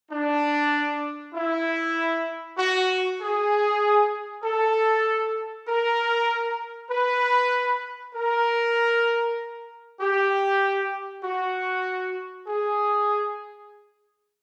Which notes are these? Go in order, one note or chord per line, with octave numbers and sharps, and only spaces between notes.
D4
E4
F#4
G#4
A4
A#4
B4
A#4
G4
F#4
G#4